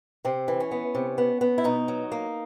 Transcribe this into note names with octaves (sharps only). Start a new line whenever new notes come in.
C3 C4
E3
C#4
B3
C3
B3
B3
E4
B2 D#4
F#3
A#3